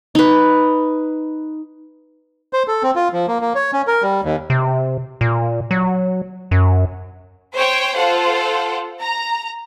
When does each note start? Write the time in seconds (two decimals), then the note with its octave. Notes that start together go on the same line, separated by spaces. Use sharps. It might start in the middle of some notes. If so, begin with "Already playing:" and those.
0.15 D#4 B4
2.53 C5
2.68 A4
2.83 C4
2.96 F4
3.13 F3
3.28 A#3
3.41 A#3
3.55 C#5
3.73 C#4
3.87 A#4
4.02 G3
4.24 D#2
4.50 C3
5.21 A#2
5.71 F#3
6.51 F#2
7.54 C5 C#5 G5
7.95 F4 A4 C5 F#5
9.01 A#5